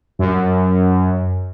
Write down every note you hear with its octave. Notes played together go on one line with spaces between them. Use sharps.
F#2